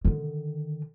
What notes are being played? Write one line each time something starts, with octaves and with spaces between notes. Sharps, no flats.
D3 D#3